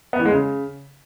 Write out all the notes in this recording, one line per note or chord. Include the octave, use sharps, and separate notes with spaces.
B3
E3
G#3
C#3